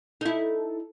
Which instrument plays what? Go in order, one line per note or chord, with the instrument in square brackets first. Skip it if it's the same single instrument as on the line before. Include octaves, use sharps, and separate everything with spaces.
[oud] D#4 E4 [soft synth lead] A4